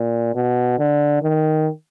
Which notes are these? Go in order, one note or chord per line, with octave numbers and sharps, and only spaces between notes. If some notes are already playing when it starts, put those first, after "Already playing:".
Already playing: A#2
B2
D3
D#3